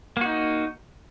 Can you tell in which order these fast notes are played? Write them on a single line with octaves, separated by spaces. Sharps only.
A#3 F#4 D#4